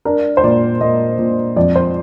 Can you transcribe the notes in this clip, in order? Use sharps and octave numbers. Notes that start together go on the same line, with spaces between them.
D4 A#4
C5
A#2 D5
A#2 D#5
A#2
F2 D5
C5